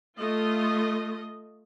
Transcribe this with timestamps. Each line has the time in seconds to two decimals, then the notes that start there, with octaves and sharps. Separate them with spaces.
0.18 A3 F4 D#5